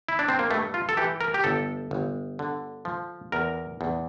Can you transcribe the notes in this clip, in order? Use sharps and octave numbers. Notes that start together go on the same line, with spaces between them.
E4
D4
C4
A#3
G2 A3
F4
A4
E3 G4
A#4
G4
G1 A4
G1
D3
F3
E2 A#4
E2